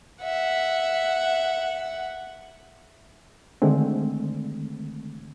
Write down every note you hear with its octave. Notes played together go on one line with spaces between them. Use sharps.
E5 F#5
D3 D#3 G#3 A3 C4